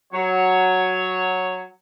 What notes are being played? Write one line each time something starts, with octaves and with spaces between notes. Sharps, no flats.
F#3 C#5